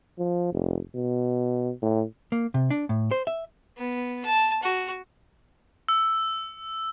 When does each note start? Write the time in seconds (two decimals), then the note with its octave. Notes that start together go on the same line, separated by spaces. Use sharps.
0.18 F3
0.52 F1
0.95 B2
1.82 A2
2.32 A#3
2.54 C3
2.71 D4
2.89 A2
3.11 C5
3.27 E5
3.77 B3
4.25 A5
4.63 F#4
5.88 E6